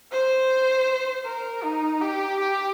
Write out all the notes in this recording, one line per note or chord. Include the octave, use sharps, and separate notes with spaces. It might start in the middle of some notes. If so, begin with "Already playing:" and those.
C5
A#4
D#4
G4
G4